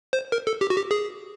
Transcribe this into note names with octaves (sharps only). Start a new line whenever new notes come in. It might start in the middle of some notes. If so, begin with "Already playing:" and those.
C5
A#4
A4
G4
F#4
G4
G#4